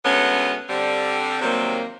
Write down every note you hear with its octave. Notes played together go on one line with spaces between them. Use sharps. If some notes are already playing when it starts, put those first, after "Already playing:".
D2 G#3 A3 B3 C#4
D3 G3 C4
C3 D#3 F#3 G3 A#3 C4